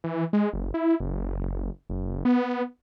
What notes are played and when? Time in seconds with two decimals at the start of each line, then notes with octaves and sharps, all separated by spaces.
0.04 E3
0.33 G#3
0.53 F#1
0.74 E4
1.00 F#1
1.90 F#1
2.25 B3